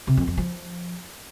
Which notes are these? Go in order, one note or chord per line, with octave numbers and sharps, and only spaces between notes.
C3
F2
F2
F3